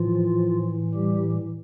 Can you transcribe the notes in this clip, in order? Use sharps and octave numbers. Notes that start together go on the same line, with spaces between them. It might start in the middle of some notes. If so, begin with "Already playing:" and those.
Already playing: A2 E3 F3 F4
G3 G4